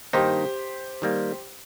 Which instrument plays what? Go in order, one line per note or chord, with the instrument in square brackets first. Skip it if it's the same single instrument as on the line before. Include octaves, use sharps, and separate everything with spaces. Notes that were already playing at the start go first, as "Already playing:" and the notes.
[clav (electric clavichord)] G2 D#3 A#3 D#4 [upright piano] G4 C5
[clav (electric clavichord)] D#3 G3 A#3